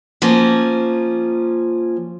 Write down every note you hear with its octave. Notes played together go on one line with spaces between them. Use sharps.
F3 A#3 C#4